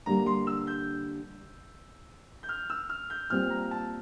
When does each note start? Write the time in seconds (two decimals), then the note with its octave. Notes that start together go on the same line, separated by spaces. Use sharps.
0.06 D3 G3 A#3 D4 A#5
0.27 C6
0.47 E6
0.67 G6
2.43 G6
2.49 F6
2.70 E6
2.90 F6
3.10 G6
3.30 A#2 G3 C4 F4 F6
3.50 A#5
3.71 A5